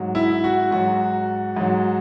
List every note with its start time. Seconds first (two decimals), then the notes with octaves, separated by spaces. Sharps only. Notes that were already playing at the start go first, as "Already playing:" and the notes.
Already playing: G#2 F#3
0.15 E4
0.44 F#4
0.71 G#2 F#3 F#4
1.57 G#2 F#3